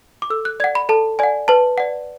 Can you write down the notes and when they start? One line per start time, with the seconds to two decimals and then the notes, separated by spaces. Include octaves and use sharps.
0.22 D6
0.30 A4 E6
0.45 F#6
0.60 D5 F#5 G#6
0.75 B5
0.89 A4 A5
1.19 D5 F#5 G#5
1.48 B4 A5
1.78 D5 F#5